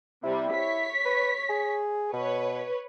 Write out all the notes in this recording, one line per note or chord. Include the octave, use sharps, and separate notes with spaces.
C3 G3 E4
C#5 B6
B4
G#4
B2 B4 C#5